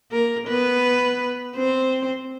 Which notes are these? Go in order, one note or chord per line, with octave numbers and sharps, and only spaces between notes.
A#3 A#4
B3 B4
C4 C5